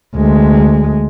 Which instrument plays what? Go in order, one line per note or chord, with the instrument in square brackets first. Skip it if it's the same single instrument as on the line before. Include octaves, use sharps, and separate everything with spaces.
[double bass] D2 G#3